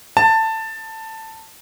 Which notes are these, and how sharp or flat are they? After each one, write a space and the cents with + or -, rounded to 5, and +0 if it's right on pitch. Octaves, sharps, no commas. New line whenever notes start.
A5 +15